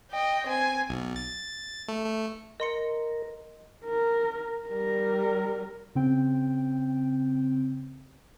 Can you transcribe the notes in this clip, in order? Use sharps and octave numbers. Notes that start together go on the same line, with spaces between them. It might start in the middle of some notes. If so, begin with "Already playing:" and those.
D#5 G5
C4 G#5
B1
A6
A3
A3
A#4 D#5 C6 C#7
A#4
G3 A#4
C#3 C4 G5